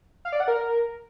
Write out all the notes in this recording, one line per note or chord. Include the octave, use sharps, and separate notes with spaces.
F5
D5
F#5
A#4